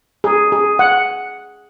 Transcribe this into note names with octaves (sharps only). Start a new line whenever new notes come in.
G#4
G#4
F#5